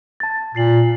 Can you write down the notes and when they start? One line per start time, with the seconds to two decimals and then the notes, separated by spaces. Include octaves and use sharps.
0.20 A5 A6
0.55 A#2 A6 C7 F#7